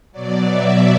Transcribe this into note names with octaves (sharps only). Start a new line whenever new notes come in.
B2 F#3 D5
E5